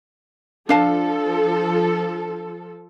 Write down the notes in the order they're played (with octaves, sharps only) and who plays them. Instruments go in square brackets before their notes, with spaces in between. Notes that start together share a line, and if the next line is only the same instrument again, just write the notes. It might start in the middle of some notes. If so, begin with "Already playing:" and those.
[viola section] F3 A4 [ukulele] D4 F5 A5